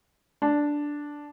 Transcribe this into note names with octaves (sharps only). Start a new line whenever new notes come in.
D4